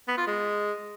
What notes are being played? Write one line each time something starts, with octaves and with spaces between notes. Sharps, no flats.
B3
F4
G#3